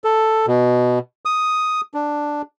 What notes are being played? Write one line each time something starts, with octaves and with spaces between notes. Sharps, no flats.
A4
B2
D#6
D4